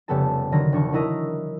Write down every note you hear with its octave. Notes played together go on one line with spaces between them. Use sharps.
F1 C#3 G3 B3 A4 A5
D3 D#3 F#3 A#6
E1 D4 C#6
F#3 D#4 E4 A#4 D#5